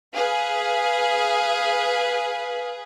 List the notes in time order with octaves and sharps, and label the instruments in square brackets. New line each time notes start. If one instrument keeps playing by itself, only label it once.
[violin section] G#4 B4 [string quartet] F5